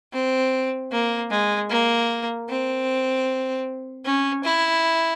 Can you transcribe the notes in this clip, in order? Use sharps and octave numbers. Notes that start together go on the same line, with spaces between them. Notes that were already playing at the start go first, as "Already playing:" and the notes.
C4
A#3
G#3
A#3
C4
C#4
E4